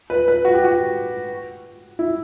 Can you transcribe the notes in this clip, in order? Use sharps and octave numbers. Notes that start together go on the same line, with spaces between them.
B4
B4
F#4
G4
F#4
E4